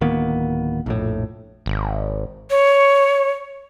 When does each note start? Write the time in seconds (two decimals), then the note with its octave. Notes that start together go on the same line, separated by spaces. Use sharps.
0.01 D1 D#3 A#3 B3
0.86 A#1 F2 A2
1.66 G#1
2.50 C#5